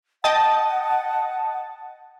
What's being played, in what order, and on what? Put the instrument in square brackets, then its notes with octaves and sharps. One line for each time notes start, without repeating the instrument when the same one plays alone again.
[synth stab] D#5 G5 D#6 [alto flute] F#5 [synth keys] A5